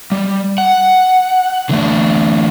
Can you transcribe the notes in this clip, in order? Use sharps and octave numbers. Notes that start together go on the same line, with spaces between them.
G3
F#5
D3 E3 A3 D4